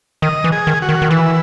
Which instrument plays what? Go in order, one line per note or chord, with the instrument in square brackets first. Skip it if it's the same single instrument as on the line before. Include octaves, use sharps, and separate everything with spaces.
[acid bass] D#3 [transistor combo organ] D#5
[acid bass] E3
[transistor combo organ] G#4
[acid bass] D#3
[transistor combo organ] F#4
[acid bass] D#3
D#3
[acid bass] E3 [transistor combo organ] E4